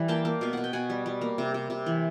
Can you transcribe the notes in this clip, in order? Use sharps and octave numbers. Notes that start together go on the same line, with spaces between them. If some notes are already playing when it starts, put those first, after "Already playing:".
Already playing: E3 G3
A#3 G5 A5
A#3
B2 F5
B2 F#5
G5
B2 F#5 G#5
G3
G3
A#3
C3
C3
C3
E3